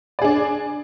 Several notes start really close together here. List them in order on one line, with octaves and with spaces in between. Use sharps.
D5 G#4 D4